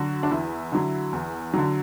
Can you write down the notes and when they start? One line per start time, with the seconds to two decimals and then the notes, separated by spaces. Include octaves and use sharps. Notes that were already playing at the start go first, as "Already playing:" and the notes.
Already playing: D3 F#3 F#4
0.23 D4
0.31 E2 E4
0.72 D3 F#3
1.13 E2
1.54 D3 F#3